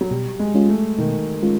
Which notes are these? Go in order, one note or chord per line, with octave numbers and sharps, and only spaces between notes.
F#3
B2 G3
G#3
G#3 C#4 F4
A3
B2 D#3
G#3 C#4 F4